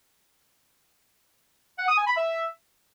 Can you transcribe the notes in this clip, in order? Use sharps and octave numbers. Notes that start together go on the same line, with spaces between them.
F#5
D#6
G#5
B5
E5